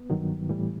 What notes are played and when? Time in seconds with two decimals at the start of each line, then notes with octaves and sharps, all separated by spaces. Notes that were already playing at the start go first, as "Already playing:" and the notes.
Already playing: B3
0.10 G2 D#3 F#3
0.49 A2 E3 G3